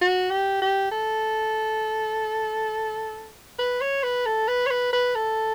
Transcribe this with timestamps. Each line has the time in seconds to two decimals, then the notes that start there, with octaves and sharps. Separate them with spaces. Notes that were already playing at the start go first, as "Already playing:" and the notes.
0.01 F#4
0.31 G4
0.62 G4
0.91 A4
3.59 B4
3.81 C#5
4.03 B4
4.26 A4
4.48 B4
4.66 C#5
4.70 B4
4.93 B4
5.15 A4